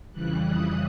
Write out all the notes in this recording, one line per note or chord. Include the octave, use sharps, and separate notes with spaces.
F2 C#3 E3 G3 F#6
D#6